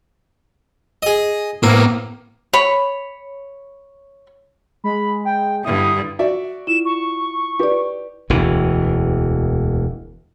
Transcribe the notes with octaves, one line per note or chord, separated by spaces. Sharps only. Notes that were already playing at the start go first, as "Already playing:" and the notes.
G#4 D#5
A2 A#3 B3 E4 C5 A#5
C#5 B5
G#3 B5
G5
G2 D3 E4 D#6
F#4 D5 E5
E4 F4 E7
C#6
G4 B4 D5
E1 D2 E3